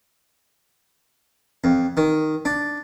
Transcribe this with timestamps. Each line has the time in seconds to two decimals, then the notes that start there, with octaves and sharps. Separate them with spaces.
1.64 F2
1.97 D#3
2.45 D4